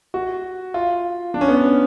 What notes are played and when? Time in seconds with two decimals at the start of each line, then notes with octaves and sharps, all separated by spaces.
0.14 F#4
0.74 F4
1.34 D4
1.41 C#4
1.48 B3
1.55 C#4